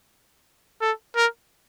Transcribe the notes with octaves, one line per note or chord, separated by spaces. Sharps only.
A4
A#4